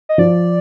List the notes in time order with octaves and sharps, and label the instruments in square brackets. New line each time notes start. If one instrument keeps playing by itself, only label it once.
[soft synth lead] D#5
[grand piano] F3 [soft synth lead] D5